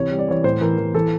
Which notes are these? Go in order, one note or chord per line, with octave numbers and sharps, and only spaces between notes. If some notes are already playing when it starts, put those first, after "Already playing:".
Already playing: C3 E3 C#5
G3
D5
E3 C#5
A2 C5
E3 A#4
E3 A#4
E3 A4